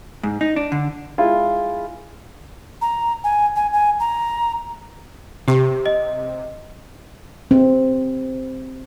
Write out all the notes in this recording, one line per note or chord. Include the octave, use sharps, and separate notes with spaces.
G#2
D#4
D4
D3
G#3 E4 F4
A#5
G#5
G#5
G#5
A#5
C3 G4
D#5
C4